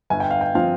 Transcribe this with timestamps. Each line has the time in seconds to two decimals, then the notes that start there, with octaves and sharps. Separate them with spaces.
0.10 G1 G#5
0.20 G5
0.30 F5
0.41 G5
0.55 F3 C4 F5